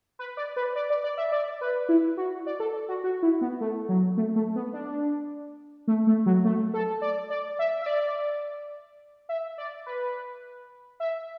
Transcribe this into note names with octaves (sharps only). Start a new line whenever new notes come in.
B4
D5
B4
D5
D5
D5
E5
D5
B4
E4
F#4
D5
A4
F#4
F#4
E4
B3
A3
F#3
A3
A3
B3
D4
A3
A3
F#3
A3
A4
D5
D5
E5
E5
D5
E5
D5
B4
E5